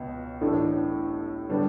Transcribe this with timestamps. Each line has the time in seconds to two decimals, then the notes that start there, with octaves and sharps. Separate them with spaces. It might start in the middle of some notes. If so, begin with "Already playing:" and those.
Already playing: C#2 B2
0.41 A1 A2 E3 A3 D4
1.49 D3 G3 B3 D4